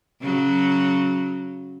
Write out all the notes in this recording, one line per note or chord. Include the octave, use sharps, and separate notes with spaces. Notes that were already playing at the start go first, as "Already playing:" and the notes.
C#3 F#3